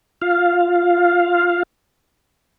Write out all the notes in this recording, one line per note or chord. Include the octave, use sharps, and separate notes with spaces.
F4 F5